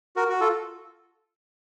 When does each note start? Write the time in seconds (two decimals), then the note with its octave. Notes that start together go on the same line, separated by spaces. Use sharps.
0.16 F#4 A#4
0.29 F#4
0.41 F4 A4